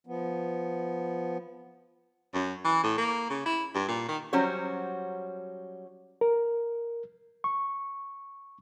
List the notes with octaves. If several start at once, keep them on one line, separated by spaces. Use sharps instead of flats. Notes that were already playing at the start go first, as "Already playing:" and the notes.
F3 B3
F#2
E3
A2
A#3
C#3
E4
G2
A#2
D#3
F#3 G3 C#4 F#4 C5 C#5
A#4
C#6